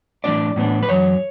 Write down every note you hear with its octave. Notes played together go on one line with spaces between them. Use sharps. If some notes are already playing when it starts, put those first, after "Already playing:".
A2 E3 B3 D4 D5
A2 E3 B3 D4
B4
F#2 E3 C#5